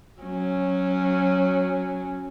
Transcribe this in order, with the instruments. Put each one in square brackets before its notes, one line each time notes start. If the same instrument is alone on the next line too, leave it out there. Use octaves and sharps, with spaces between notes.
[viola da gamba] F#3 C#4